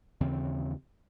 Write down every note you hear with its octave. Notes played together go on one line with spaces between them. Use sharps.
D#2 C#3 E3 C4